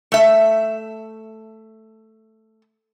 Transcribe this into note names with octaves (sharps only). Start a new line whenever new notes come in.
A3 E5